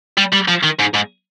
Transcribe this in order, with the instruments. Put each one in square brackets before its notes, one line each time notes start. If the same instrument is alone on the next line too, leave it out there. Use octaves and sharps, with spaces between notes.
[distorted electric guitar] G3
G3
F3
D#3
G#2
G#2